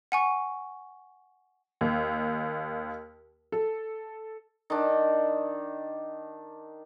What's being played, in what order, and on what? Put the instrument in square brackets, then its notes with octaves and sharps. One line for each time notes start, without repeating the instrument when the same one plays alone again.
[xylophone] F#5 G#5 C#6
[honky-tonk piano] D#2
A4
[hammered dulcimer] D#3 D4